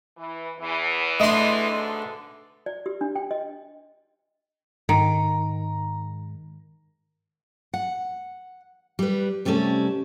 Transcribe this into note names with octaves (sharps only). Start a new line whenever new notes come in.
E3
E2 E3
A3 D4 D#5 C6
G#2 B2 D3
D5
G4
D4
G5
D#5
G#2 D#3 A#5
F#5
G3 B4
C3 G3 A3 C#4 A4